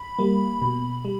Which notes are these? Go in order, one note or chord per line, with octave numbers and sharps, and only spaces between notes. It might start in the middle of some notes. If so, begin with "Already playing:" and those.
Already playing: B5
G3 A#3
B2
G3